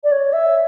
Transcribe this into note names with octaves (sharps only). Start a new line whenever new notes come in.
D5
C#5
E5